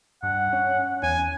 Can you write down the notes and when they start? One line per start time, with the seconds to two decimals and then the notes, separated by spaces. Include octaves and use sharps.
0.23 G2 F#5
0.53 C#4
1.03 E2 G#5